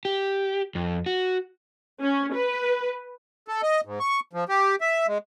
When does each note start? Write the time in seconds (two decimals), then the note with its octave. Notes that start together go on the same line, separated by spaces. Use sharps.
0.05 G4
0.75 F2
1.06 F#4
2.01 C#4
2.33 B4
3.48 A4
3.63 D#5
3.85 G#2
4.00 C#6
4.33 F3
4.49 G4
4.81 E5
5.07 G#3